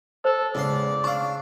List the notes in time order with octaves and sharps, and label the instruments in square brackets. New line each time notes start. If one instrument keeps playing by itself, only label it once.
[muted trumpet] A4 [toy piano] C5
[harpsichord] E2 G#3 C6 [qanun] C#3 [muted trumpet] D5
[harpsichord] D4 F5 [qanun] A5 [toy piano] C#6 E6